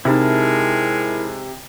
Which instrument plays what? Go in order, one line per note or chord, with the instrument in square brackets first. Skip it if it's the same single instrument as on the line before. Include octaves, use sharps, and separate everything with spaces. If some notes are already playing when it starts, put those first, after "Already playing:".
[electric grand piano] C3 [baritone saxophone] G#3 [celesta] D#4 G4 [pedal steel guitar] E4 A#4 A5